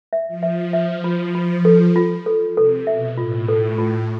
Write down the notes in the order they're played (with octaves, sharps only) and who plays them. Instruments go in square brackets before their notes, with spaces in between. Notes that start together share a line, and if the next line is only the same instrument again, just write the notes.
[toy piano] E5
[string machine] F3
[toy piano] E5
E5
F4
F4
A4
F4
A4
[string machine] C3 [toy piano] A4
[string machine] B2 [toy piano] E5
[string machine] A2 [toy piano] F4
[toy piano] A4
F4